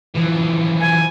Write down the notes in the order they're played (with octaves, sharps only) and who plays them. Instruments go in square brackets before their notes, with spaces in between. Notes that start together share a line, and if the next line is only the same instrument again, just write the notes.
[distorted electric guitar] E3 F3
[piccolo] G#5